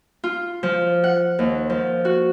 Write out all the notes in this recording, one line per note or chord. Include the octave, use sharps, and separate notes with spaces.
F4
F3
F#5
D#2
F3
F#4